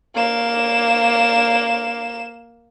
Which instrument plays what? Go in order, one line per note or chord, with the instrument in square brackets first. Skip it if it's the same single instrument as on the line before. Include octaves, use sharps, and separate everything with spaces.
[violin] A#3 E7